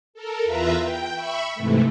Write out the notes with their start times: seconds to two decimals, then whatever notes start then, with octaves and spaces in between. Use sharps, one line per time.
0.14 A4 A#4
0.45 E2 F4 B4 E5 A#5
0.80 G5
1.13 E5 B5 C#6
1.54 G#2 C3 E3 A3